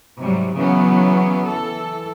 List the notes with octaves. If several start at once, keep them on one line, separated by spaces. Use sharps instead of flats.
G#2 C3 F#3 G3
C#3 E3 F#3 B3 C#4
E3 A4